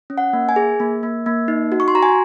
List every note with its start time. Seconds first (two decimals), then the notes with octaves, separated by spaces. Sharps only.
0.10 C#4
0.18 F#5
0.33 A#3
0.49 G#5
0.56 G#4
0.80 A#3
1.03 A#3
1.26 A#3
1.48 D#4
1.72 F#4
1.80 C#6
1.88 C6
1.95 F#4 A#5
2.03 G#5